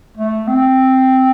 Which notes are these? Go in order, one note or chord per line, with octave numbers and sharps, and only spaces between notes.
A3
C4